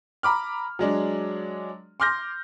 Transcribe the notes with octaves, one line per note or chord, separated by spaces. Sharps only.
A#5 B5 D6 F6
F#3 G#3 D4
C6 D6 F6 G6 A#6